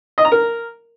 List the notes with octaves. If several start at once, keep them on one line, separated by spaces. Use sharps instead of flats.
D#5
A#5
A#4